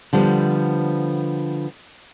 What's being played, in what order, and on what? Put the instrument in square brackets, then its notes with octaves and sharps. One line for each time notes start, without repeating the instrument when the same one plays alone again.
[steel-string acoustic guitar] D3 F3 G3 B3